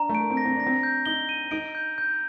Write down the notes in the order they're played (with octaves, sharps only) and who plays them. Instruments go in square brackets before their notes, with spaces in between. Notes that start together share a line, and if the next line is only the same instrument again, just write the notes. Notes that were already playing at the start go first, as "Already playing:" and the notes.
Already playing: [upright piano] D4 [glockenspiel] A#5
[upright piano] A3
[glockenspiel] D7
[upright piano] A#3
C4
[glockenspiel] A#6
[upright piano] C4
[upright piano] D4 [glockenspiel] A#6
[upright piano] C4
[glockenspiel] G6
[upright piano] D#4 [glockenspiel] G7
[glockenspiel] D#7
[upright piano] D#4 [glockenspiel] D7
[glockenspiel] G6
G6